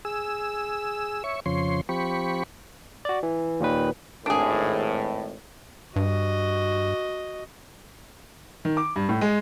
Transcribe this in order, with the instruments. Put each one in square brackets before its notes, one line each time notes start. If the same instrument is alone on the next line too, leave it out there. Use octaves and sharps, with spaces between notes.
[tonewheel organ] G#4 E6
C#5 E5 C#6
F2 C#3 F3 C#5 C6
F3 C4 G4 B5 C#6
[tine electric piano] F#4 D5
E3
D#2 A#2 D#3 B4
[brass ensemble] G#1 A2 [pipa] D4 G#4
[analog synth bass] G2 [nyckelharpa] F#4 D#5
[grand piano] D#3
D6
G2
A2
G#3